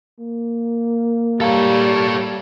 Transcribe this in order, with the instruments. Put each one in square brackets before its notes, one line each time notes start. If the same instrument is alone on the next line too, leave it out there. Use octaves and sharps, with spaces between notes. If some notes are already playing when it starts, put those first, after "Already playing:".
[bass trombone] A#3
[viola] G3 [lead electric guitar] A4 C#5 [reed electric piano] F5 A#5